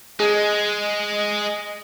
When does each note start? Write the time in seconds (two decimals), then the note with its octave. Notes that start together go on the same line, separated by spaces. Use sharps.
0.20 G#3 G#4 D#5